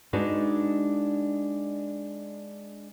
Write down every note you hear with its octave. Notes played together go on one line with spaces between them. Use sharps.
G#3 D4 D#4 F#4 B4